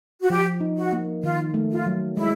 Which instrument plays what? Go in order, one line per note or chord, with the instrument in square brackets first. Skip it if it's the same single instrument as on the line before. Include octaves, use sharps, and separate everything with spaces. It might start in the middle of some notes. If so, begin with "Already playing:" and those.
[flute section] F#4
[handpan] F3 [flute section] G4
[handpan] D#4
[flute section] F#4
[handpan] A#3
[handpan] D#3 [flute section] F4
[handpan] A3
[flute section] F4
[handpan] F#3
[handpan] G#3 [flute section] E4